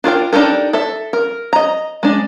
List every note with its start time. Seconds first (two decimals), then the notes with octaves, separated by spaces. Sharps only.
0.04 D4 F4 A#4 G5
0.33 D4 D#4 G4 A4 A#4
0.73 A4 E5
1.13 A#4
1.53 D#5 A#5
2.03 G#3 D4